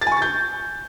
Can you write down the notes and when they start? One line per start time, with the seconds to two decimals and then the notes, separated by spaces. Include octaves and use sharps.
0.01 A6
0.07 G#5
0.12 C#6
0.17 A6
0.22 G6